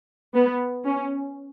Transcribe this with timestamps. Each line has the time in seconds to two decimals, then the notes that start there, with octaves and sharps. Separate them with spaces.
0.34 B3
0.85 C#4